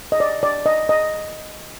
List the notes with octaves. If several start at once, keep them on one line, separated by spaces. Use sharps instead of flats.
D#5
D5
D5
D#5
D#5